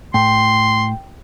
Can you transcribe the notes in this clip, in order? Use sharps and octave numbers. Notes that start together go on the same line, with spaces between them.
A2 G5 C6